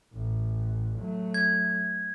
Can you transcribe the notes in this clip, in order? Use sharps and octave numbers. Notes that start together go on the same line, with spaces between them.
A1
F#3 A3
G#6